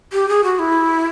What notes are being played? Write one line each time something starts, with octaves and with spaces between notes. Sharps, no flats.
G4
G#4
F#4
E4